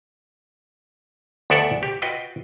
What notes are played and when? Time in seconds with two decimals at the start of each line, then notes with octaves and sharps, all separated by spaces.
1.50 D2 B3 A4 D5 E5 F#5
1.83 G4
2.02 F4 F#4 B4 D#5 G5